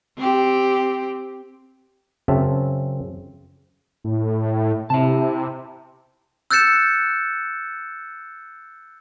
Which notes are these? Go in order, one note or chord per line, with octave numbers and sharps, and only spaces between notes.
C4 G4
F#2 C#3 C4 E5 A5
A2
C3 E4 A5
E6 F#6 G6 A6 C#7 E7